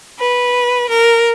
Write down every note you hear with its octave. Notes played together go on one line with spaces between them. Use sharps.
B4
A#4